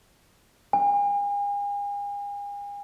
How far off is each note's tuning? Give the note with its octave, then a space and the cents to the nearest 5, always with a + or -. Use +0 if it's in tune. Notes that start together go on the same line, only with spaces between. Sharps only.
G#5 -40